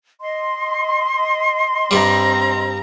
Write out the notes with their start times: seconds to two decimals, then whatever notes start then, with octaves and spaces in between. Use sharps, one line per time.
0.21 D#5 C6
1.91 G2 G3 C4 A#5